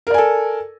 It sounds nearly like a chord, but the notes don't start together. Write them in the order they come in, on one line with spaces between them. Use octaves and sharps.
A#4 D5 G#5 A4